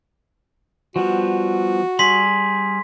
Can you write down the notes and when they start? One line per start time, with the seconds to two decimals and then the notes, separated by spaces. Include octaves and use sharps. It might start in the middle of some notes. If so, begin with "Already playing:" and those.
0.96 F3 G3 B3 F#4
1.99 G3 G#4 C6 B6